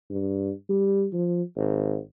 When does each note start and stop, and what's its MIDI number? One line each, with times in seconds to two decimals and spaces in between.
0.11 0.51 43
0.69 1.06 55
1.13 1.43 53
1.57 1.98 32